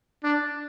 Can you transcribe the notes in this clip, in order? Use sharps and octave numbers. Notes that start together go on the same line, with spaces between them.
D4